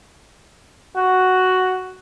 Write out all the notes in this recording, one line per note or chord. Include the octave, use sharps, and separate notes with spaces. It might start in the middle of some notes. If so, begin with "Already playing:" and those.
F#4